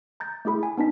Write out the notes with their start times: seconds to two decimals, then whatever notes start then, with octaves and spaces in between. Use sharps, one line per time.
0.20 A#5 G6 A6
0.45 A3 E4 G#4 B5
0.63 G#5
0.77 B3 D4 D#4 B6